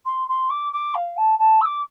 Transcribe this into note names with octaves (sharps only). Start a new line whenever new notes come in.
C6
C6
D6
D6
F5
A5
A5
E6
D6